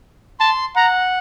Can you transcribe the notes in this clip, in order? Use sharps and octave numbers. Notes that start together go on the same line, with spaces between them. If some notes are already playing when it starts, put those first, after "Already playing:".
A5 C6
F#5 A#5